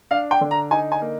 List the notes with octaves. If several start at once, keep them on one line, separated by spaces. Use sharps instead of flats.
D4 F5
G5
D3
A#5
D#4 G#5
G#5
A#3